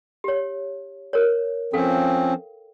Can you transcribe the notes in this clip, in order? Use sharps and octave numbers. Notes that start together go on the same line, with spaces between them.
G4 C#5
A#4 C#5
F3 C4 C#4 A4 F5 G5